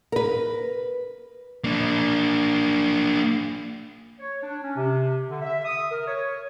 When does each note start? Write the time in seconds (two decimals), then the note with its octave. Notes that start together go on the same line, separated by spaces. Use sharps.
0.12 A#4 B4
1.64 A#3 D4
4.19 C#5
4.43 D4
4.63 C#4
4.76 C3
5.29 D3
5.42 E5
5.64 D#6
5.91 A#4
6.07 C#5